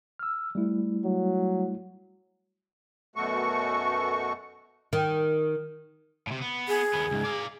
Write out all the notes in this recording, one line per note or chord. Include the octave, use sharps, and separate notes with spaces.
E6 F6
G3 A3 E4
F#3
F#2 B2 A3 F#4 C#6
D#3
A2 C3
B3
G#4
D#2 B3
C#2 G#2
D5 F5